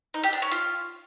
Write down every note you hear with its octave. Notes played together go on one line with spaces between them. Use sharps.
D#4
G4
D4
C#4
F4